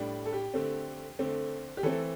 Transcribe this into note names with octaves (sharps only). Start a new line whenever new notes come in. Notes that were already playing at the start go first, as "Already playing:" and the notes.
Already playing: A2 G3 D4
A4
G4
D3 A3 C4
D3 A3 C4
G4
E3 A3 C4 A4